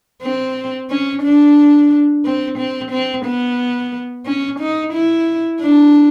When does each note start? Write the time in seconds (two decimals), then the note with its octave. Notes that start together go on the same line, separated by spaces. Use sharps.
0.23 C4
0.90 C#4
1.23 D4
2.25 C4
2.58 C4
2.91 C4
3.25 B3
4.26 C#4
4.60 D#4
4.93 E4
5.60 D4